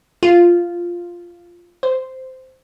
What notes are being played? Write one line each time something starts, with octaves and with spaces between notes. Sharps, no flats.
F4
C5